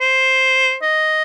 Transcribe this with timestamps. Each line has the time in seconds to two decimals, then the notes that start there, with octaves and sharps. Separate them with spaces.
0.01 C5
0.83 D#5